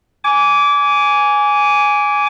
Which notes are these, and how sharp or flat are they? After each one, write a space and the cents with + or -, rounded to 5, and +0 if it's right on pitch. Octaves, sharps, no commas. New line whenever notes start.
G#5 +0 D6 -25